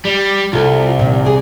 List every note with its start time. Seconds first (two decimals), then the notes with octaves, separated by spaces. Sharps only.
0.05 G3
0.53 C2 F4 A4
0.99 A#2 D#3
1.25 G#4 D5